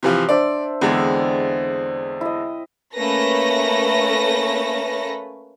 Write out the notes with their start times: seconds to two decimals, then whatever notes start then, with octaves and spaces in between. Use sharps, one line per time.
0.03 C3 E3 F3
0.29 D4 C5 D5 E5
0.81 E2 D3 G#3 C4
2.21 E4 D#5
2.95 A3 A#3 C#4 B4 A#6